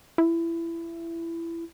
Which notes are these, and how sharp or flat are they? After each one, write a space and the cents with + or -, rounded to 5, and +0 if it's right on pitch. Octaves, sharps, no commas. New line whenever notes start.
E4 +20